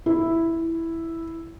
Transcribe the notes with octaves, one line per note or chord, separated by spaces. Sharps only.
E4